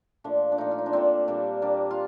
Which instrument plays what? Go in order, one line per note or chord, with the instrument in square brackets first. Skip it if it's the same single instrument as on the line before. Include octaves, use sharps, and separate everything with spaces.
[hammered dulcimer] A#2 F3 A3 D4
D4
A#2 F3 A3 D#4
F4
D#4
D4
A#2 F3 A3 C4
A#2 G3 A#3 D4
A#2 G3 A#3 D4
F4